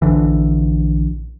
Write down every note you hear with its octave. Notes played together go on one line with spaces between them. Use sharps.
A#1 D3 E3